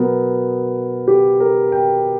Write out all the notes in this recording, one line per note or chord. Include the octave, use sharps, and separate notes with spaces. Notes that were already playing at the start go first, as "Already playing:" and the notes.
Already playing: B2 F#3 B3 A#4
G4
A#4
G5